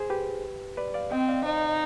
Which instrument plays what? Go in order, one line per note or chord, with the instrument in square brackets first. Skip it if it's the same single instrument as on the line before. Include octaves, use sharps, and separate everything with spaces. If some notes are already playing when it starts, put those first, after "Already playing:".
Already playing: [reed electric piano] G#4 C5
G4 B4
B4 D5
D5 F5
[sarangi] C4 [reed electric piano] D#5 G5
[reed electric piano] D5 F5
[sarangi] D#4 [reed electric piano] C5 D#5